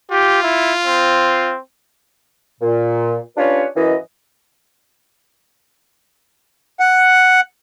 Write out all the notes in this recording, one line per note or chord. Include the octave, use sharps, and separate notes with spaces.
F4 G4
E4
C4
A#2
G3 C#4 D4 F4 B4 C#5
F#2 E3 D#5
F#5